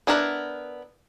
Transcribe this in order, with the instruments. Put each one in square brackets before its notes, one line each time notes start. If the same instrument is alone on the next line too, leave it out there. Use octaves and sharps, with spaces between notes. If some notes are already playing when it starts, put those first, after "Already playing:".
[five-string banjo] B3 D4 E4 A#4 F#5